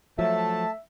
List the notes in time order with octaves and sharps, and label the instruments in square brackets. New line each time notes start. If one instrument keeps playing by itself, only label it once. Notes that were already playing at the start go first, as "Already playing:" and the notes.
[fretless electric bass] F3 F#3 [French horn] A3 [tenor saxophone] E5 [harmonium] A5